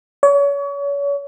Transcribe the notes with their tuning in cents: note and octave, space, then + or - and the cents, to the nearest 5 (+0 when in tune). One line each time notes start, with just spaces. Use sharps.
C#5 +35